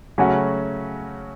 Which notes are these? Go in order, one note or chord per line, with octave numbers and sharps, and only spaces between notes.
C#3 F#3 A3 C#4 F#4